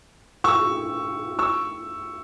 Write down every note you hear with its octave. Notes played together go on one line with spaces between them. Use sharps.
C#6 E6
C#6 E6